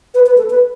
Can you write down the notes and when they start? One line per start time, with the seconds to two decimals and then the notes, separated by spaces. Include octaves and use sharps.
0.14 B4
0.26 B4
0.38 A4
0.50 B4